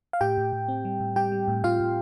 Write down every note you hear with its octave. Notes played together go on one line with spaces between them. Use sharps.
F5
A2 G4 G5
A2
A2
C4
G3
A2
G3 G4 G5
G3
A2
A2 F4 F5
A2